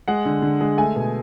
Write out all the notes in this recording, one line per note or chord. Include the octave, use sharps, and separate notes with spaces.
G#3 F#5
D3
D3
G#3
A3 G#5
B2